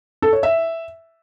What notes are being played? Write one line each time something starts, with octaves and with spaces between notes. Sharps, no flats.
A4
C#5
E5